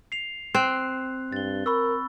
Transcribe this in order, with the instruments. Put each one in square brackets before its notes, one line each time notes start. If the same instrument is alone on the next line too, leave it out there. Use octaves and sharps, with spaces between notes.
[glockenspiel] C7 F7
[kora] C4 [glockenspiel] F#6
[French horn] G2 [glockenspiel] A6 G7
[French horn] A#4 [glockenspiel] B5 C#6 E6